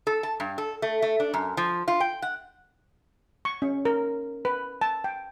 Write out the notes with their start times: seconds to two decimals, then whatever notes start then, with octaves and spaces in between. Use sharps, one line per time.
0.07 A4
0.23 A5
0.40 G2
0.58 A4
0.82 A3
1.02 A3
1.20 D4
1.34 F#2
1.57 F3
1.88 F4
2.00 G5
2.22 F#5
3.45 C#6
3.62 C#4
3.85 A#4
4.45 B4
4.81 A5
5.04 G5